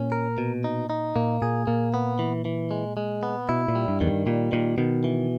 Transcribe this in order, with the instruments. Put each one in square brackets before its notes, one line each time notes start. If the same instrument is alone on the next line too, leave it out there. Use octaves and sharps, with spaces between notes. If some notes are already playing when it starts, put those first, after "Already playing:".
Already playing: [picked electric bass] A#2 [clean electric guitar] C#4
[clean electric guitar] A#4
B2
D#4
D#4
[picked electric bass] A#2 [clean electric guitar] A#3
[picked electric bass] A#2 [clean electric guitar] G#4
[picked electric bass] A#2 [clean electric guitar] A#3
[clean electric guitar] B3
E3
E3
G#3
G#3
B3
[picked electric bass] B2 [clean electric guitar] E4
[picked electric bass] A#2
[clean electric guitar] G3
[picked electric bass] G2
[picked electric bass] E2 [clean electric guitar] D#3
[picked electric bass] G2
[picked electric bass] A#2 [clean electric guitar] G3
[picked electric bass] A#2 [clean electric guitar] D#3
[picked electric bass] B2 [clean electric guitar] D#3
[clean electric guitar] E3